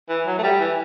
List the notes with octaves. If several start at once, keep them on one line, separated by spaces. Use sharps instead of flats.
E3
F#3
A3
G3
E3